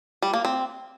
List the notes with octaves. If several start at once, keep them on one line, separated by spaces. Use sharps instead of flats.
G3
A#3
C4